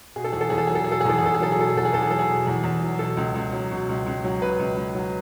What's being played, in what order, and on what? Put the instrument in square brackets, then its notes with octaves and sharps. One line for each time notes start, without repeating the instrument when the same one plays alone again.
[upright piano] B2 G#4
A4
E2 G#4
A4
E2 G#4
A4
F#3 G#4
A4
B2 G#4
A4
G#4
E2 A4
G#4
E2 A4
G#4
F#3 A4
G#4
B2 A4
G#4
E2 A4
G#4
E2 A4
G#4
F#3 A4
G#4
B2
E2
E2
F#3
B2 A4
C#2
C#2
F#3
B2
C#2
C#2
F#3
B2 B4
C#2
C#2
F#3